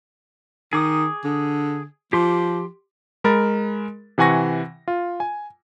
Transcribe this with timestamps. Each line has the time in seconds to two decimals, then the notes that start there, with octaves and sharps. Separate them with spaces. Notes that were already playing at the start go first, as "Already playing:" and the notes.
0.73 D#3 G#4 D6 D#6
1.24 D3
2.13 F3 G4 C6 D6
3.24 G#3 A#4 B5 A6
4.18 C3 E3 F#5 G#5 C#6 A#6
4.88 F4
5.20 G#5